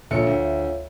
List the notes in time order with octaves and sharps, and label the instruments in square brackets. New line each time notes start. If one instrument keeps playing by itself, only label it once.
[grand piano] A#1 A4 C#7 [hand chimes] F4 C#5 E5
[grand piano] D2